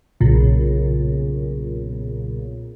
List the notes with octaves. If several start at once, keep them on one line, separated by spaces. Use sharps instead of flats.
B1 A#2 C#3